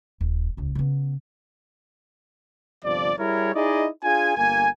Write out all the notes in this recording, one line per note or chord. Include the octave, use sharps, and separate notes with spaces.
D#1
D#1 C#2
C#3 B3
G1 C3 F3 D5
G3 E4 G#4 A#4 C#5
D#4 E4 G#4 D5 D#5
D4 F4 G#4 G#5
G1 A#3 G#5